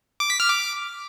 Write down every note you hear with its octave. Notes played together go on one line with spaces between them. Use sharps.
D6
B6
F6
D6